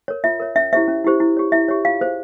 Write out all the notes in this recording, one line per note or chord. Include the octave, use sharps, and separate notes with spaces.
A#4 C#5
F4 E5
A#4 C#5
C#4 E5
E4 G4 C5 E5
C#4
E4 G4 C5
E4
G4 C#5
E4 E5
G4 C#5
F4 F5
G#4 C5